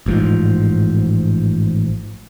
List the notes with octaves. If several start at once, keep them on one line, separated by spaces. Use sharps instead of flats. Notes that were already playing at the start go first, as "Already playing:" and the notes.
A1 G#2 F3